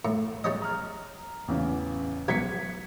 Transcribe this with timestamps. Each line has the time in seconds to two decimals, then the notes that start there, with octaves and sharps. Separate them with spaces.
0.05 A2
0.44 G3 C#4 D#5
0.62 A#5 F6
1.48 A1 E2 C#3
2.28 B1 B2 G#6 B6 C#7